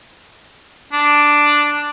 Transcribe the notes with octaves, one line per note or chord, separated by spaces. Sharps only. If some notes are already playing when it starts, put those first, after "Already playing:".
D4